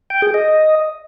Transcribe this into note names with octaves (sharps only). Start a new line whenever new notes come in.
G5
G#4
D#5